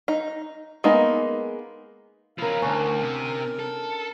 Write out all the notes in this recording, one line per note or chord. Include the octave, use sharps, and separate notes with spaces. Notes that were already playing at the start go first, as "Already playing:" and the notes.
D#4
G#3 A#3 B3 D#4
F3 C#4 E4 A#4 F5
D2 C#4 D4 A#4
C3
A4